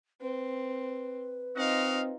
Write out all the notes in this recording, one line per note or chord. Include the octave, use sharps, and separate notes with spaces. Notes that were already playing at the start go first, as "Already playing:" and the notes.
C4 B4
C4 D#4 F4 F#4 D#5 F5